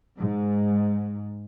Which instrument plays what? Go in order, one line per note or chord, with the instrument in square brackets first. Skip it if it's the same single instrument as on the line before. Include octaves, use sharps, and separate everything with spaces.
[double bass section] G#2